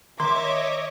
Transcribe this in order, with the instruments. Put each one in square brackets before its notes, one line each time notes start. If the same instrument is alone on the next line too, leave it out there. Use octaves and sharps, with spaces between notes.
[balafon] D#3 [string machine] C#5 D#5 [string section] E5 D6 [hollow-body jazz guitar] C6